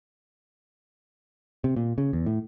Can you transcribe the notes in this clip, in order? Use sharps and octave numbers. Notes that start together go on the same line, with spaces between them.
C3
A#2
C#3
E2
A2